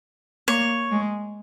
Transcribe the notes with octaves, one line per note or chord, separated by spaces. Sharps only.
A#3 C#5
G#3